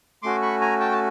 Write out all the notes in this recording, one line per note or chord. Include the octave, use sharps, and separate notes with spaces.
A3 C#4 F#4 C6 D6
B5 C#6
G#5 A#5
G5 A5
A5